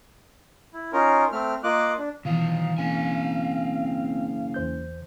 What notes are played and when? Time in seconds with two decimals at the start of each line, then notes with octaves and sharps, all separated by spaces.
0.73 E4
0.93 C#4 D#4 F4 A#4
1.32 A3 C4 F6
1.64 A#3 F4 D#5 D6 F#6
1.98 D4
2.25 B2 D#3 E3 F4 F5
2.78 F#1 C4 G#5
4.54 E2 C5 G6